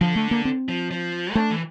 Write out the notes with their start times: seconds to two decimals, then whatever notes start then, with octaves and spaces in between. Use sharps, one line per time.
0.01 D3 F3
0.16 A3
0.31 A#3
0.45 C4
0.69 F3
0.91 F3
1.35 A3 D4
1.51 E3